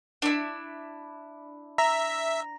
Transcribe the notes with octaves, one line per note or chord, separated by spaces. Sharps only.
D4 E4
E5 A#5 A#6